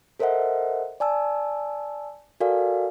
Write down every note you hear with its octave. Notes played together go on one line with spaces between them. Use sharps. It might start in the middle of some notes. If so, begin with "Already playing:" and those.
A4 A#4 C5 D#5 E5 F#5
D5 G#5 A5 E6
F#4 A4 A#4 D5 F5 G#5